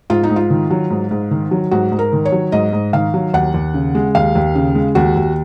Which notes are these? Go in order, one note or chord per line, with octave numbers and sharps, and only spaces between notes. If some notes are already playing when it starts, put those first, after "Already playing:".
G#2 F4
D#4
G#2
F4
D#3
F#3
G#2
G#2
D#3
F#3
G#2 F#4
G#2
A#4
D#3
C#5
F#3
G#2 D#5
G#2
D#3 F5
F#3
D#2 F#5
D#2
C#3
G#3
D#2 F5
D#2
C#3
G#3
D#2 F#4
D#2